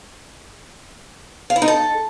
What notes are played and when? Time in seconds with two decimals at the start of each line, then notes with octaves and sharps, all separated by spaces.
1.50 F5
1.56 E4
1.62 D#4
1.68 A4